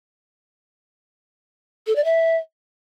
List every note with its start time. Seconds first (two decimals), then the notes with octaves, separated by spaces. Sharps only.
1.87 A4
1.95 D5
2.04 E5